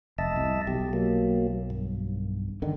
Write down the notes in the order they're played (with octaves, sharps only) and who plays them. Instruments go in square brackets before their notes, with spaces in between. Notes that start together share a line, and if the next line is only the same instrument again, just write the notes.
[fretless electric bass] F1 [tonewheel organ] D#5 E5 A5
[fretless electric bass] C2
[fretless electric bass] B1 [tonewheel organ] G4
[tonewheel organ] F#3 A#3
G2
[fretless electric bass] D3 D#3